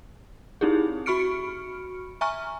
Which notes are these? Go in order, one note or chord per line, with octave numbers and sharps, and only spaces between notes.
C4 D#4 E4 G4 G#4
F#4 B5 C#6 F6 C#7 D7
E5 G#5 A#5 C#6 F6